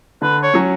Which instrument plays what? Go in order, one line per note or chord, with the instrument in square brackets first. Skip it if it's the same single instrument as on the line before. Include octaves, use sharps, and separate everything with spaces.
[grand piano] D3 [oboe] B4
[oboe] C#5
[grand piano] F#3 C#4